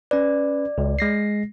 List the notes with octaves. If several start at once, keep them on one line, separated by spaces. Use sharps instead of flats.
C#4 B4 D5
C#2
G#3 A#6 C7